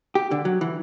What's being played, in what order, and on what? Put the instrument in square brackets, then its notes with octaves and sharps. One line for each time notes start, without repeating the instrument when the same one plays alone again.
[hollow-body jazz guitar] G4
D3
F#3
E3